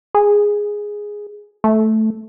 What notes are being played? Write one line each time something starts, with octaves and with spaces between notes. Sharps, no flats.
G#4
A3